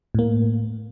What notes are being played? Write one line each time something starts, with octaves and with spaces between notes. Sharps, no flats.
A2 A#3